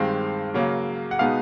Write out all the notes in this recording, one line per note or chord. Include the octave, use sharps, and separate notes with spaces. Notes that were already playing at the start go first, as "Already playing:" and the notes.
Already playing: G2 D#3 G#3 C4 F5
C#3 F#3 A#3
F#5
B2 G#3 B3 D#4 F5